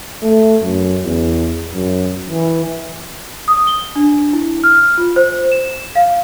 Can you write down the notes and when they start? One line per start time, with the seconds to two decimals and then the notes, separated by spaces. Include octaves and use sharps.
0.22 A3
0.62 F#2
1.04 E2
1.74 F#2
2.29 E3
3.48 D#6
3.67 G7
3.96 D4
4.33 E4
4.64 F6
4.98 F4
5.16 C5
5.52 E7
5.95 F5